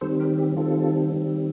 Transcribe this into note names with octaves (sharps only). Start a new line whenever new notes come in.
D#3 G3 C4 A4 C5
G4 A#4
G4
D#3 G3 C4 F4 A4
D#3 G3 C4